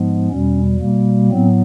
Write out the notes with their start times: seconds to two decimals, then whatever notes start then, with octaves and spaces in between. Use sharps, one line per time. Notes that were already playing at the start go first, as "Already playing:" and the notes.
Already playing: G#2 F3 G#3 B3
0.29 E2 B2 G3 C#4
0.79 B2 G3 A#3
1.30 A2 F#3 B3 C4